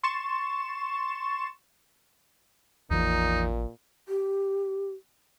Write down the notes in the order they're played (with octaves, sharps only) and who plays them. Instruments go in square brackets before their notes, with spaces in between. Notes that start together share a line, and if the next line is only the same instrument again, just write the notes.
[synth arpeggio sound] C6 C#6 A6 E7
[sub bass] A1 [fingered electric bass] E2 E3 F3 [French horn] A#2 [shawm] D#4
[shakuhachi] G4